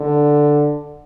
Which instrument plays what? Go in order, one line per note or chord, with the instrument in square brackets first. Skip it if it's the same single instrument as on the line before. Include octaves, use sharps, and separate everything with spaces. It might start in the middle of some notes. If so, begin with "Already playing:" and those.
Already playing: [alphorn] D3